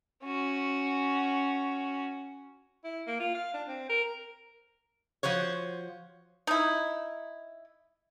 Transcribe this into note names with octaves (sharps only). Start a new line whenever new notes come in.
C#4 F#4
E4
A#3
F4
F5
D4
C4
A#4
F3 F#4 C5 C#5
D#4 E4